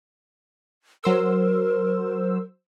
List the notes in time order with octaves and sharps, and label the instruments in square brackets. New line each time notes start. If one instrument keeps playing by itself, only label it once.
[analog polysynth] F#3 C5 E6 [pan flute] A#4